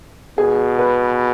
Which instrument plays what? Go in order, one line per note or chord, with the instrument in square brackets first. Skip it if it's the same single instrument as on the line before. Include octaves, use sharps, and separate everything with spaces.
[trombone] B2 [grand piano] G#4
[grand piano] B4